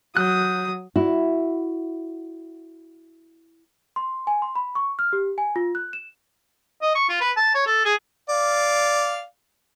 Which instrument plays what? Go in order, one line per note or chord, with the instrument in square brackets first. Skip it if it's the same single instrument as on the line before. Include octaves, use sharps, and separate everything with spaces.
[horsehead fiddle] F#3 [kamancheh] D#6 [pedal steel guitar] F#6 G6
[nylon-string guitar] E4 F#4
[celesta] C6
G#5
C6
B5
C#6
F6
G4
G#5
F4
F#6
E7
[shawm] D#5
C#6
F4
B4
A5
C#5
A4
G#4
[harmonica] D5 F5